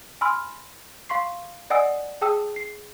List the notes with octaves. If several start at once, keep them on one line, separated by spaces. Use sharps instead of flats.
G#5 B5 C6 E6 F6
F5 C6 C#6 C7
D5 D#5 F#5 G#5 D#6 E6
G#4 G5 A5 D#6 E6
C7